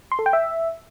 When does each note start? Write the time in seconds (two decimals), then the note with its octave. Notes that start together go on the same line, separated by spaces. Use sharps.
0.12 C6
0.19 A4
0.26 G5
0.33 E5